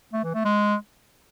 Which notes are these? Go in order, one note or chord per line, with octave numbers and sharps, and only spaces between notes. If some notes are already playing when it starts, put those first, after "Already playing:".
A3
E3
A3
G#3